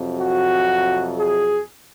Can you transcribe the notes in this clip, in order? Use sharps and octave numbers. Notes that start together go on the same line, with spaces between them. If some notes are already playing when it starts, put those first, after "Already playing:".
Already playing: F2 C3 F#3
F#4
G#4